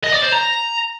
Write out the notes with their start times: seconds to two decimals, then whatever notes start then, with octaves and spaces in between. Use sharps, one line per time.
0.04 D#5
0.13 D5
0.23 C5
0.32 A#5